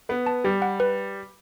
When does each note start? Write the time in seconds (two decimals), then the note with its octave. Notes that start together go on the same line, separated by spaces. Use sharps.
0.09 B3 B4
0.26 A5
0.44 G3 G4
0.62 F#5
0.80 B4